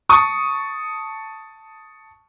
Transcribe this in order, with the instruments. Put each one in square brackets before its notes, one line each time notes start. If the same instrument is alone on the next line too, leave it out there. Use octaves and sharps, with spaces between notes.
[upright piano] A5 C#6 D#6